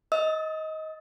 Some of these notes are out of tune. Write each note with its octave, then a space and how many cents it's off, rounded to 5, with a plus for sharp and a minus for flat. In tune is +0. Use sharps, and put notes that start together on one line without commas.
D#5 +15 E6 -45